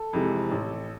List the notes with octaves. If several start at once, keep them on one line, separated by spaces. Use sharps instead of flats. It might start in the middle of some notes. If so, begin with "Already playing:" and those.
Already playing: A4
F2 C3 E3 G#3
A1